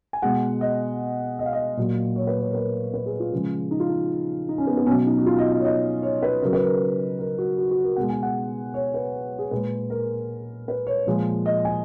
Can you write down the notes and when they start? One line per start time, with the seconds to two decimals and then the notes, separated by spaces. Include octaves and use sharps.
0.13 G#5
0.22 B2 G#3 F#5
0.61 D#5
1.39 D#5
1.46 F5
1.53 D#5
1.77 A#2 F#3
2.16 C#5
2.27 B4
2.39 C#5
2.51 A#4
2.55 B4
2.94 B4
3.06 G#4
3.20 F4
3.32 C#3 F3 G#3
3.71 D#4
3.80 F4
3.89 D#4
4.49 D#4
4.58 C#4
4.67 B3
4.77 B3
4.86 B2 F#3 C#4
5.06 D#4
5.18 F#4
5.26 F4
5.38 D#5
5.52 D#5
5.59 C#5
5.65 D#5
6.03 C#5
6.22 B4
6.41 C#3 F#3 A#4
6.53 B4
6.63 A#4
7.19 A#4
7.38 F#4
7.58 F#4
7.71 F#4
7.84 A#4
7.96 B2 G#3 F#5
8.10 G#5
8.23 F#5
8.74 C#5
8.94 B4
9.39 G#4
9.51 A#2 G#3 B4
9.90 A#4
10.68 B4
10.87 C#5
11.06 A#2 F3 G#3
11.46 D#5
11.65 G#5